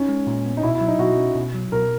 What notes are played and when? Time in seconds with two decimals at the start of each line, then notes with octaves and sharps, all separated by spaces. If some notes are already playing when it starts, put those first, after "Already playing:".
Already playing: C#4 D#4
0.09 G#3
0.27 A#2
0.45 B3
0.57 D#4
0.63 B2 E4
0.75 E4
0.81 F#3
0.88 D#4
0.99 B2 F#4
1.17 C#4
1.35 B2
1.54 F#3
1.72 B2 A#4